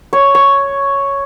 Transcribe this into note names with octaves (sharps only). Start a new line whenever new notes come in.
C#5
C#5